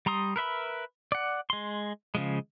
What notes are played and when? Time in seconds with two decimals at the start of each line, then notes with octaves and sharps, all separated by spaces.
0.06 G3 A#5 C6 D#6
0.36 A#4 B4 E5 B5
1.12 D5 F#5
1.50 G#3 C6
2.15 C#3 F3 G#3